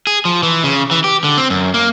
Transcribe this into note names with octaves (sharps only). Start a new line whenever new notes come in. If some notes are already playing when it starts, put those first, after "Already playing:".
G#4
F3
E3
C#3
E3
G4
D3
C4
F#2
A#3